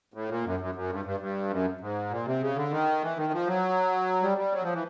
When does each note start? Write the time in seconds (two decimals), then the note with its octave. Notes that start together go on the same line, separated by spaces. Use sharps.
0.14 A2
0.29 A#2
0.44 F#2
0.60 F#2
0.75 F#2
0.90 G2
1.05 G2
1.20 G2
1.50 F#2
1.80 G#2
2.10 A#2
2.26 C3
2.41 C#3
2.56 D3
2.71 D#3
3.02 E3
3.16 D#3
3.32 F3
3.47 F#3
4.22 G3
4.38 G3
4.53 F#3
4.63 F3
4.73 E3